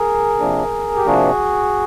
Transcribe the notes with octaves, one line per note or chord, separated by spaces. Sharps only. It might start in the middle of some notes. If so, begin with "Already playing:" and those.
Already playing: G#4 A#4
C3 F3 A#3 D4
G4
C3 F3 A#3 D4 F#4 G#4